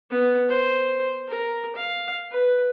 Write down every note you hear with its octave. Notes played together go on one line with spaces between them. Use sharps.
B3
C5
A#4
F5
B4